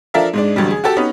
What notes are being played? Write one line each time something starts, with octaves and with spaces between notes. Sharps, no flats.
F3 D4 A4 A#4 E5 F5
G#2 G#3 D4
A1 D3 F#3 G3
G#4
F#4 G4 A4
B3 C#4 D#4